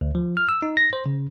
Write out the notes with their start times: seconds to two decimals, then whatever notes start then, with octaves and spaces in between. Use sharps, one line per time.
0.01 D2
0.15 F3
0.37 F6
0.49 E6
0.62 D#4
0.77 A#6
0.93 C5
1.06 C#3